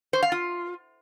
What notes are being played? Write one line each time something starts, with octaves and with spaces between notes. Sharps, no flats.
C5
F5
F4